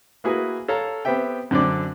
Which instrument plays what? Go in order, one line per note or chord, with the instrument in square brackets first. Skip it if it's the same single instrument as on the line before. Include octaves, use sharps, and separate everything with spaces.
[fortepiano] A#3 E4 F#4 G#4 B4
A4 C#5 F5 A5 A#5
B3 C4 G4 E5 G5
F#2 D3 C4 D4 D5 D6